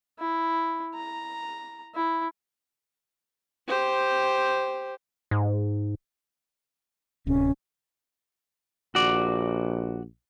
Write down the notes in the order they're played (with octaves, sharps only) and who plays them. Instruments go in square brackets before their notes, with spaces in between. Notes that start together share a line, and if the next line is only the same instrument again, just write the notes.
[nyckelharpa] E4
A#5
E4
G4 C5
[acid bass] G#2
[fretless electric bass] D1 C3 [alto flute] C#4
[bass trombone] A#1 [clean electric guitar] F#4 D5